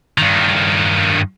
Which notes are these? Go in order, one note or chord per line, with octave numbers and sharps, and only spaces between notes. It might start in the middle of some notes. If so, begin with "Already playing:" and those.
G2 D#3